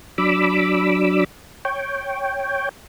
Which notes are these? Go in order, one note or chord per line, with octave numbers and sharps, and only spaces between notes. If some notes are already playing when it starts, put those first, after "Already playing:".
F#3 D4 B5 D6 E6
C#5 G5